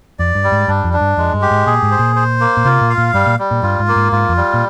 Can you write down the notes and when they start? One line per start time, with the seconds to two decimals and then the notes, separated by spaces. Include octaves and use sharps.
0.19 F2 D5
0.35 G2
0.44 G3
0.52 G#2
0.68 G2 D4
0.84 F2
0.93 D4
1.01 G2
1.17 F2 G#3
1.34 G2
1.42 G4
1.51 G#2
1.67 A#2 G#4
1.83 G#2
1.91 C5
1.99 A#2
2.16 C5
2.40 A#3
2.57 A#2
2.65 C3 F4
2.81 A#2
2.90 F5
2.98 A#2
3.14 G2 G3
3.26 A#2
3.39 G3
3.51 A#2
3.63 G2 F4
3.79 G#2
3.88 A#3
3.96 G#2
4.12 G#2 F4
4.29 F2
4.37 G3
4.54 A#2